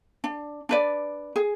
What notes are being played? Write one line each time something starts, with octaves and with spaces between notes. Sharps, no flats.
D4
D4 B4 D5
G#4